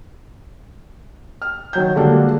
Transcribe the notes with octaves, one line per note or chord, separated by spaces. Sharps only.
F6
D#3 F#3 G6
D3 G3 G#3 A#3 D4 F#4